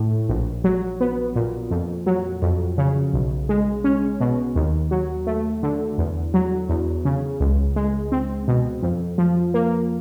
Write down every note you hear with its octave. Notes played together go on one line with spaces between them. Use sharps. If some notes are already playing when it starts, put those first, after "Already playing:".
Already playing: A2 A3
A#1
F#3
B3
A#2
F2
F#3
F2
C#3
B1
G#3
C#4
B2
D#2
F#3
A3
D3
E2
F#3
E2
C#3
C#2
G#3
C4
B2
F2
F3
A#3